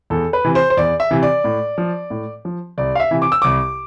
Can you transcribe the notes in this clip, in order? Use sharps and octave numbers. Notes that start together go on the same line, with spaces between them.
E2 A4
B4
C3 E3
C5
C5
E2 D5
E5
C3 E3
D5
A2
F3
A2
F3
C2 D5
F5
E5
C3 E3
D6
E6
C2 D6